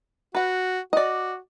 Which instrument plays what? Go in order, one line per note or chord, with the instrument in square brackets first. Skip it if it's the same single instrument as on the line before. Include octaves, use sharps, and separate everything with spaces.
[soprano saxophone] F#4 [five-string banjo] B4 F#5
[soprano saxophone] F#4 [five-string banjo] D5 D#5